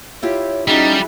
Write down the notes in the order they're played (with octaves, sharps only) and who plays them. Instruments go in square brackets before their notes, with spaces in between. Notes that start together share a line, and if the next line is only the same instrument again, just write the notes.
[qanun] E4 F4 G4 [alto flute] C#5
[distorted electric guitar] G3 [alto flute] C#4 [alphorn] D#4 [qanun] E4 F#4 G#4